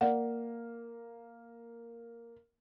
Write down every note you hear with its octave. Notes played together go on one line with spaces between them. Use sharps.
A#3 D5 F#5